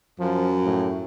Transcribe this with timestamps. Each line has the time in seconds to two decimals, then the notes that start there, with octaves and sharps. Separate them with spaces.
0.20 F#2 F3
0.64 A2